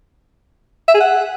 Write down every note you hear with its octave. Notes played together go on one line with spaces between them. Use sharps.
E5
G#4
F#5